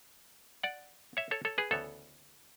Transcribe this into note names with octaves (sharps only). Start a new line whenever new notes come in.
D5 F#5
C#5 E5
A4 C#5
A4 C#5
G#4 B4
D2 C#3 E3 B3 A4 C#5